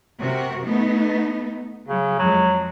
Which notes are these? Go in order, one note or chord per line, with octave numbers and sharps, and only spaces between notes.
C3 F#4 A#4
A3 B3 D#4
C#3 F#3
F2 F3 F#3 G#3